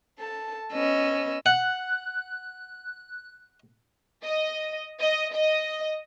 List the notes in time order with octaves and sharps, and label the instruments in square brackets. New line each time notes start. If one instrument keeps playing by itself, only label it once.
[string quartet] A4 A5
B3 C#4 D#5 E6
[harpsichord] F#5 [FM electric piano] F#6
[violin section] D#5
D#5
D#5